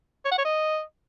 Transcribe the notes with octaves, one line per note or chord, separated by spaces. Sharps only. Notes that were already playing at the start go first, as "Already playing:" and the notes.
C#5
F#5
C#5
D#5